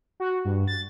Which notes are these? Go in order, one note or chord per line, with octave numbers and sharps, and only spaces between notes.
F#4
G2
A6